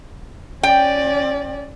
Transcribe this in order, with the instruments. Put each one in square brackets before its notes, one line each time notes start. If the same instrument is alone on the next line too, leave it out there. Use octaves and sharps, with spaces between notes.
[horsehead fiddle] C#4 D5 [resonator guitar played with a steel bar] G5